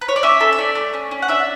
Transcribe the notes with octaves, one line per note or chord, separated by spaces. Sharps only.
B4
C#5
D5
C#4 E5
A4
E5
A3 D5
A3
C#4
C#4
F#5
D4 E5